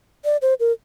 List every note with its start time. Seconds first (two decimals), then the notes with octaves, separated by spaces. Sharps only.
0.25 D5
0.42 C5
0.60 A#4